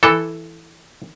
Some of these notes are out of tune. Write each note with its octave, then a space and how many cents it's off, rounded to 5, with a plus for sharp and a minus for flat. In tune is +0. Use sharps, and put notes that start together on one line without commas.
E3 +0 A4 +0